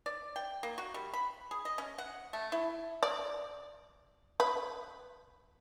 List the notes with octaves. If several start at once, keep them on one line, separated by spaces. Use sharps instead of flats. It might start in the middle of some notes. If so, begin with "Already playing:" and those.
D5
G5
A#3
F#4
G3
B5
G#4
D#5
C#4
F#5
A3
E4
D5
B4